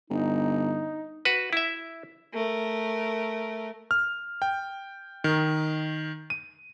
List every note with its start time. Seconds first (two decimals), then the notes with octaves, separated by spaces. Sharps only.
0.10 G1 D#4
1.25 F#4 B4
1.53 E4 E5
2.33 A3 A#4
3.91 F6
4.42 G5
5.24 D#3
6.30 D#7